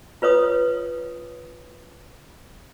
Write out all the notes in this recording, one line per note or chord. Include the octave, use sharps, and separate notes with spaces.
F4 B4 C#5 D#6